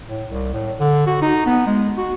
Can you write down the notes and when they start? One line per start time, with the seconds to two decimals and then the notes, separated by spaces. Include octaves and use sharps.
0.08 A2
0.29 C2
0.54 A2
0.80 D3
1.07 F#4
1.22 D#4
1.47 B3
1.67 G#3
1.98 F#4